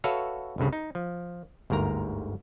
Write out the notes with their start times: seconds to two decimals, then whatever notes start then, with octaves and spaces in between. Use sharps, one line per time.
0.04 F#4 A4 B4 C#5 E5 F5
0.58 G1 C2 G2 C#3
0.73 D#4
0.95 F3
1.70 G1 D2 G#2 A#4 A#5